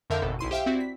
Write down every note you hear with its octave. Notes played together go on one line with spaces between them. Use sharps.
F2 D3 A#4 E5 F5 G6
G#1 B2 A4
B1 E4 C6 D#7
G4 C5 E5 F5 G5
C4 E4 F#4 D5
B6